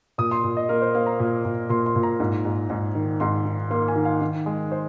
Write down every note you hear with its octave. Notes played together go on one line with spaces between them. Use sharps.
A#2 D#6
C6
A#2
D#5
A#3 A#4
C5
A#3 F5
A#5
A#2
A#2
A#2 C6
C6
A#2
A#5
G#2
G#2
G#2
D#3
G#2 C6
D#3
A#3 C6
G#5
D#3
F5
D#3
G#3
C5